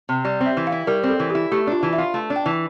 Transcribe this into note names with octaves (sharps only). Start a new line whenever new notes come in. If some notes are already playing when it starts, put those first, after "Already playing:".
C3
G3 D5
C4
E5
E3
F5
E4
G3 A#4
C4
A4
E3
E4 G4
A3 G4
D4 F4
E3
E5
F4
A3
D4
G5
E3